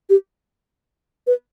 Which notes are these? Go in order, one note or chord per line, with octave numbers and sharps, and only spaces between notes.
G4
B4